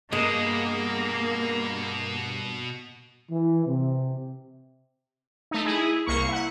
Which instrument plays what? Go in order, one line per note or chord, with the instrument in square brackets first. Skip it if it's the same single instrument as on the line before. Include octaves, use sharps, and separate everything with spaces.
[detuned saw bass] G2 [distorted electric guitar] B2 [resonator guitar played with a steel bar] G#3 [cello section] A#3
[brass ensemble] E3
C3
[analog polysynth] A3 D#4
E4 G#4
C2 A#3 C#6
E4 F#5